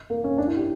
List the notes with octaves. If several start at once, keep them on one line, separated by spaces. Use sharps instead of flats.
A#3
C#4
D4
E4
G4